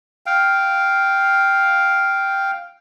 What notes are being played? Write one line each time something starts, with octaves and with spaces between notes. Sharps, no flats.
F5 G5